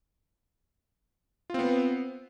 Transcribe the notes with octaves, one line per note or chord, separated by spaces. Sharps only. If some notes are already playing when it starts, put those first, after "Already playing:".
B3 C4 F4